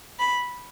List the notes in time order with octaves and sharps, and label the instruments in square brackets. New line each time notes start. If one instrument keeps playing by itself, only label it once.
[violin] B5